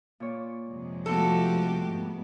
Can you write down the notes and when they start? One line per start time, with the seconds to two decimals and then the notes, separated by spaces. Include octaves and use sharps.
0.20 A#2 C#5 D5
0.69 F2 C3 G#3
1.06 F3 A3 B3 F#4 G4 A4 E6
1.90 G#2 G#3 B3